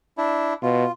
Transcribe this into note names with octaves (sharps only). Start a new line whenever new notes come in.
D4 E4
B2 F4